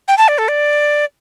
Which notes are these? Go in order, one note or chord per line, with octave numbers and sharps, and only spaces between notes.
G5
A5
D5
A4
D5